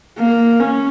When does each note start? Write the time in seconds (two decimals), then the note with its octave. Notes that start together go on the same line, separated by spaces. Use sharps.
0.19 A#3
0.60 C#4